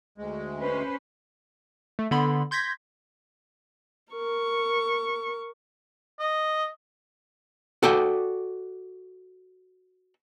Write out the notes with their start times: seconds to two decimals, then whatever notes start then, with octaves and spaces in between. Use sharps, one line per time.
0.18 D2 G#3
0.61 C#4 B4 C5
1.99 A3
2.11 D3 B3 B5 C6
2.51 C6 G6 G#6 A#6 B6
4.12 A#4 C#6
6.19 D#5
7.83 F#4 A4 D5 G5